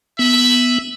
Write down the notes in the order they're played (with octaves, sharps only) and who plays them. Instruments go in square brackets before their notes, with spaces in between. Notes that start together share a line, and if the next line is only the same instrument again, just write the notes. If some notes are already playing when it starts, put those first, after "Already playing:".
[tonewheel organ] B3 [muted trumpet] E5